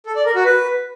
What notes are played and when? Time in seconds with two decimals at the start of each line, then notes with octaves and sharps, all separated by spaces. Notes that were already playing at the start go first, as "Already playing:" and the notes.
0.06 A4
0.16 D5
0.25 A#4
0.35 F#4
0.45 B4